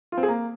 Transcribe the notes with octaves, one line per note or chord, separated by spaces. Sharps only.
F4
C4
G#4
A#3